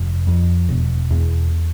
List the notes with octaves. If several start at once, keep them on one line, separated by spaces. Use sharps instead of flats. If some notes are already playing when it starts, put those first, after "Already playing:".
Already playing: F1
F2
E1
E2